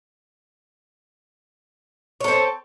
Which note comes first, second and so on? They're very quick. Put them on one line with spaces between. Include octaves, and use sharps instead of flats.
C#5 A4 C4